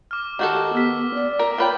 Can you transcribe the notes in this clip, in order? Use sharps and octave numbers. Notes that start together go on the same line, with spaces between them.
D6 F6
D#3 F#4 G4 A4
B3 E6 F6 B6
D5
A#4
F4 B4 C#5 G5